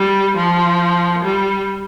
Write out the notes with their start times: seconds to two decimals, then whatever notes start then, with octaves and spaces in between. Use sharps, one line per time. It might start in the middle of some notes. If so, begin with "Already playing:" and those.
Already playing: G3
0.37 F3
1.25 G3